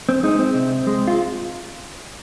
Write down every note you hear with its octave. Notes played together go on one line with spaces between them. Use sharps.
C4
G#3 D#4
C4
C3
G#3
F4